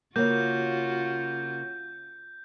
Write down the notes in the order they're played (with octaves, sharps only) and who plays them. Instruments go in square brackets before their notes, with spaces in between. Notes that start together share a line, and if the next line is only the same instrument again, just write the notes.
[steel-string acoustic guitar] C#3 A#3 [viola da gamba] F4 F#4 [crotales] G6